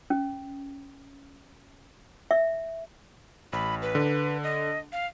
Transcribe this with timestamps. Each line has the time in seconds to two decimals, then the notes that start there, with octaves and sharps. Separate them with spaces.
0.10 C#4
2.31 E5
3.53 A1 B5
3.82 B4
3.95 D3
4.43 D#5
4.92 F5